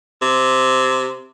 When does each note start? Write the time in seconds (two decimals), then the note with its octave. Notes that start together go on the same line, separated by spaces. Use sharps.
0.22 C3